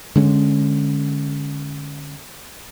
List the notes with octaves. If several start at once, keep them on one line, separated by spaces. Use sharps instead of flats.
D3 G#3 C#4